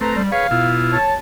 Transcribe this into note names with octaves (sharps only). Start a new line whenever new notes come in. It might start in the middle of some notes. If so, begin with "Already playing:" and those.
A3 C4 B4 A#5
G3
G#4 B4 C#5 F5
B2 E4 F4
C#5 A5